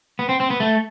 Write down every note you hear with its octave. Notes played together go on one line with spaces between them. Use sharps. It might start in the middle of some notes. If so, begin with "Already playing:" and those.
B3
C4
C4
B3
A3